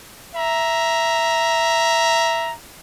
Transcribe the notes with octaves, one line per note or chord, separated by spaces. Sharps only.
E5 A#5